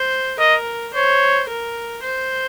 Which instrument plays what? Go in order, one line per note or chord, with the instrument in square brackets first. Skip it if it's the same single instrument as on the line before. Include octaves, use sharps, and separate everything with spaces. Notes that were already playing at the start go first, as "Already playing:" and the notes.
Already playing: [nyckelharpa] C5
[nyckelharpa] A#4 [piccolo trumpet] D#5
[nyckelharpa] C5 [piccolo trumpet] C#5
[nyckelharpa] A#4
C5